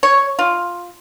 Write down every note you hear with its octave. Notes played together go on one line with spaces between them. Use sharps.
C#5
F4